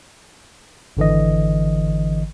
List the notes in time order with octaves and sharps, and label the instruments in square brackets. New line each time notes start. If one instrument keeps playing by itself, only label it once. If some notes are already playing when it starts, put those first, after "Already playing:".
[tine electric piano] G#1 D3 E3 D#5